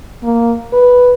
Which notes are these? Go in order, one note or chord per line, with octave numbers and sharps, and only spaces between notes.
A#3
B4